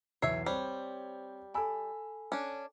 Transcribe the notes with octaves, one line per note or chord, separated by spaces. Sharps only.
B1 E2 C#5 E5 C7
G3 C4 C5 C#5
A4 G#5 A5 B5 E6
C#4 D4